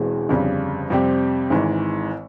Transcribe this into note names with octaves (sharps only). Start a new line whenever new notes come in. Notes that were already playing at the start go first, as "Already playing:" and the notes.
Already playing: E1 E2 E3 G#3 C4
G1 F2 C#3 G3
F2 C3 G3 C4 G4
G#1 G#2 E3